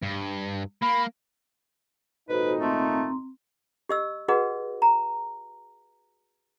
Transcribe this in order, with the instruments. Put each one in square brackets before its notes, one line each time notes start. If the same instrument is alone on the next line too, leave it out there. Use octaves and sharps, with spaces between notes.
[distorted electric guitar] G2
[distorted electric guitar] A#3 [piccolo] B5
[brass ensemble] G#1 A#2 D#4 [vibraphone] F#4 A4 C5 [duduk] B4
[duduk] A3 [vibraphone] C4 A#5 C6
[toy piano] G4 D#5 E6
F#4 G#4 B4 D#5 F#5
A#5